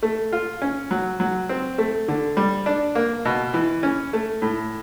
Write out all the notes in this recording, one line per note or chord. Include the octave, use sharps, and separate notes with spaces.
A3
F4
C#4
F#3
F#3
C4
A3
D3
G3
D4
A#3
B2
E3
C#4
A3
A2